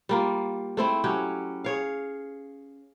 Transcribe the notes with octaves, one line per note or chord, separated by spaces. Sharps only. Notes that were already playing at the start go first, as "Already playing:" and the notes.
G3 A#3 F4
A3 C4 E4
F#3 C#4 G4
G#4 C#5 F5